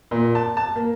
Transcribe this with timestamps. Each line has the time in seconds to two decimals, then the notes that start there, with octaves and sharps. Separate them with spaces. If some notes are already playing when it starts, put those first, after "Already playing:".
0.11 A#2
0.35 A5
0.57 A5
0.76 A#3